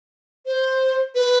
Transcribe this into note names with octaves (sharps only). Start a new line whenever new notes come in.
C5
B4